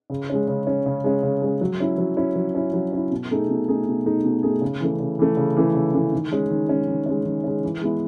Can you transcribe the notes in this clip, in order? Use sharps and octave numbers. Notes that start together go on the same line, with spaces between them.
C#3
G#3 C#4
C#3
G#3 C#4
C#3
G#3 C#4
C#3
G#3 C#4
F#3
C#4 E4
F#3
C#4 E4
F#3
C#4 E4
F#3
C#4 E4
B2
A3 D#4 G#4
B2
A3 D#4 G#4
B2
A3 D#4 G#4
B2
A3 D#4 G#4
C#3
E3 A3
C#3
E3 A3
C#3
E3 A3
C#3
E3 A3
D#3
G#3 C#4
D#3
G#3 C#4
D#3
G#3 C#4
D#3
G#3 C#4
E3
G#3 B3 E4